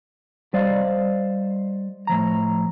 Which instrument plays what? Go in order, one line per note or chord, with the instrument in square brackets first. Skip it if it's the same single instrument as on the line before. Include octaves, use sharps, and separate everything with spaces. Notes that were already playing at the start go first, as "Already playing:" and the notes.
[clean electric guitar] G3 C5 D5 D#5 F5
A2 F3 A#5